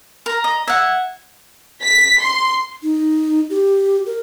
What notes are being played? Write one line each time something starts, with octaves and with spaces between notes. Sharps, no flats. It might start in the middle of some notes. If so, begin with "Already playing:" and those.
A#4 A#5
D#5
E5 F#5 G#6
B6
C6
D#4
G4
A#4